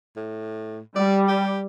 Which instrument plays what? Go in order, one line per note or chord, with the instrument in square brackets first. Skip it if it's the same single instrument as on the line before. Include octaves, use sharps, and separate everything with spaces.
[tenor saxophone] A2
[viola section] G3 [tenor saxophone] D5
[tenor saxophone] G4